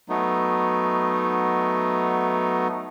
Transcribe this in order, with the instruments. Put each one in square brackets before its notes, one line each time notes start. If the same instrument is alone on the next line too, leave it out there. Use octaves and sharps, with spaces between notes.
[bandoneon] F#3 A3 B3 D#4